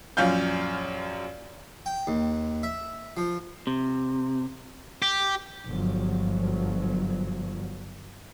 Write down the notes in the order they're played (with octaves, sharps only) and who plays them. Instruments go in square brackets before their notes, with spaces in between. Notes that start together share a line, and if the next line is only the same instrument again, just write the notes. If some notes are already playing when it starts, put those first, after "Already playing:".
[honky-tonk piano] A#1 F#2 C#4 F5 G6
[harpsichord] G5
D#2
E5
F3
[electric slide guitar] C3
[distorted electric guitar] G4
[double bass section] G1 F3 F#3